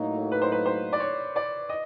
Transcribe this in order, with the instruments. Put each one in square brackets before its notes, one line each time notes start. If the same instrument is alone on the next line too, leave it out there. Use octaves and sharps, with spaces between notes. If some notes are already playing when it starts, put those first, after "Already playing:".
Already playing: [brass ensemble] A2 F#3 A#3 D#4
[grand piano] B4
C5
B4
C5
D5
C#5
D5
D#5